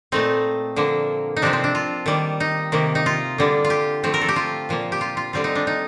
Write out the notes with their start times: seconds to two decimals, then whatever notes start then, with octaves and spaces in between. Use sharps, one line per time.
0.12 A#2 A3 C4 D#4
0.76 D3 F3 A#3
1.37 D#4
1.42 C3 F3 C4 D4
1.53 C4
1.64 D4
1.75 F4
2.06 D#3 G3 A#3
2.40 D#4
2.72 C3 D#3 A#3
2.95 D#4
3.06 F4
3.38 D3 G3 A#3
3.65 F4
3.70 G4
4.03 D3 F3 A3 C4
4.14 A#4
4.21 A4
4.29 G4
4.36 F4
4.69 A#2 F3 A#3
4.92 G4
5.01 F4
5.17 F4
5.33 D3 G3 C4 F4
5.44 D#4
5.55 D4
5.67 D#4